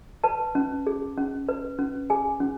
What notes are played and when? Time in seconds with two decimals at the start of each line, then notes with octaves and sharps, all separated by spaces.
0.24 B4 A5
0.55 C#4
0.87 G#4
1.18 C#4
1.49 B4
1.79 C#4
2.10 G#4 G#5
2.40 C#4